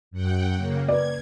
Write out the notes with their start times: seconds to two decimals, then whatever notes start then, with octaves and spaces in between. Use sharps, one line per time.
0.11 F#2 F#5 G5
0.55 C#3 A#3
0.88 B4 D5 G#6